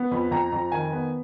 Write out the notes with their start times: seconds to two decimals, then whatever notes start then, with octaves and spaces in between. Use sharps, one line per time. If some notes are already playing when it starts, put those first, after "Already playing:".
Already playing: B3
0.11 F2 B5
0.31 F2 A#5
0.52 F2
0.72 D#3 G#5
0.93 B3